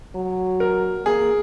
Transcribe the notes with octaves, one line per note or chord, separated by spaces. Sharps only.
F#3
A#4
A#3 G#4